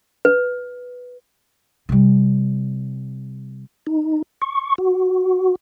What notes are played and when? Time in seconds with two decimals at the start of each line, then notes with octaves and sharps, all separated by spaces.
0.25 B4
1.89 C3 G3
3.87 D#4
4.42 C#6
4.78 F#4